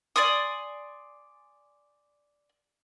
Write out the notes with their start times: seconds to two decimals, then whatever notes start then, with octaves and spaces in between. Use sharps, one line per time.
0.16 D5 G#5 C6 D#6